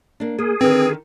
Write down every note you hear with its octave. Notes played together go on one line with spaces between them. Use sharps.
A#3 D4
A#3 G#4
D3 D#3 C4 B4